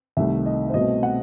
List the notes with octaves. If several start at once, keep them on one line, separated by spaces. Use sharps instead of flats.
C2 C3 D#3 A3 E5
D#5
C5
C2 B2 A3 C4 D#5
F#5